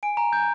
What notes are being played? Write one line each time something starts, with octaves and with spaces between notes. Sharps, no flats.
G#5 D7
A#5
G6